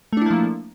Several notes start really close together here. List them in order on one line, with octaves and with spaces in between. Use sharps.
A3 D4 E4 A#3 F3